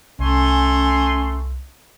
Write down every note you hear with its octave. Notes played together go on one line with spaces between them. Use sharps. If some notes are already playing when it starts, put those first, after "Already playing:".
C2 A3 C#4 G#5 C6